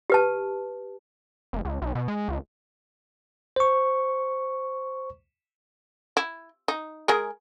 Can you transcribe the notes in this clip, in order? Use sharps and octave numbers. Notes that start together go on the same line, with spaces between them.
G4 B4 A5
F1
C#2
B1
B2
G#3
C#2
C5 C#6
E4
D#4
G#3 G#4 A#4